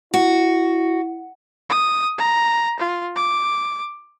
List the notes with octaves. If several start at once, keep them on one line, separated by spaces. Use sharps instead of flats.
E4 F#4
D#6
A#5
F4
D6